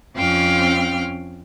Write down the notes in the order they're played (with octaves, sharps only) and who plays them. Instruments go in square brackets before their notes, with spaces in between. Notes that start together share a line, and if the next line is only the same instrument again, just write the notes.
[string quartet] F2 C4 C#4 F5 G5 F6